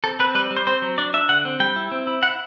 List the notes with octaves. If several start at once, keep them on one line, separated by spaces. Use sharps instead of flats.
C4 A4
C4 B4
G3 B4
G3
C5
C4 C5
F#3
D4 D5
D4 E5
D3 F#5
C4
G3 G5
E4
C4
E4
E4 F#5